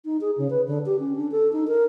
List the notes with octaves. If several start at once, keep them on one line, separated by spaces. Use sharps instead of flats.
D#4
G#4
C#3
B4
D3
G4
C#4
D4
A4
D#4
A#4